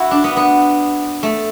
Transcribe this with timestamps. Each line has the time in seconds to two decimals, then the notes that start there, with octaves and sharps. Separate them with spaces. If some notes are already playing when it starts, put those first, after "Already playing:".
Already playing: E4 F#4
0.11 D4
0.24 B3
0.37 B3
1.23 A3